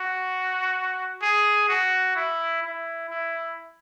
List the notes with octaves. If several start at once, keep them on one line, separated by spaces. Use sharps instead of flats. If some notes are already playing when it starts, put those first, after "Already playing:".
Already playing: F#4
G#4
F#4
E4
E4
E4